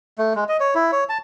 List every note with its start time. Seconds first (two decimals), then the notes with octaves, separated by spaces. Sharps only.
0.18 A3
0.35 G#3
0.49 D#5
0.60 C#5
0.75 E4
0.92 C#5
1.09 A5